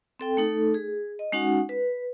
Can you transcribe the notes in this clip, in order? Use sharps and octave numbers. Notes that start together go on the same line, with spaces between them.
C4 A4 G5
A3 D#4 A4
G#4
D#5
G#3 C#4 D#4 F#4 F#5
B4